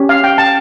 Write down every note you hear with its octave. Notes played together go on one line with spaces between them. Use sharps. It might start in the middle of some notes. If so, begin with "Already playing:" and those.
Already playing: C#4 G4
F5
G5
A5